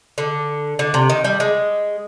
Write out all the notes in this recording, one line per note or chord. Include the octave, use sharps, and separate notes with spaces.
D3
D3
C3
D#3
G3
G#3